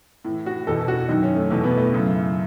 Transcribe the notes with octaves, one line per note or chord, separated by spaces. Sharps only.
A2 E3
F#4
E2 B2 A4
F#4
F#2 D#3 D#4
C#4
A3
E2 B2 A3
B3
A3
F#2 C#3 E3